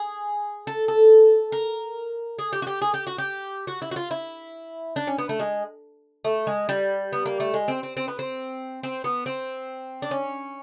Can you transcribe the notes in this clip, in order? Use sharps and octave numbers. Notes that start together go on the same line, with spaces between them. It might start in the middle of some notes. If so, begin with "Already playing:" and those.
Already playing: G#4
A4
A4
A#4
G#4
G4
F#4
G4
G#4
G4
F#4
G4
F#4
E4
F#4
F4
E4
D4
C#4
B3
A3
G#3
A3
G#3
G3
B3
A#3
A3
G#3
C4
C4
C4
B3
C4
C4
B3
C4
D4
C#4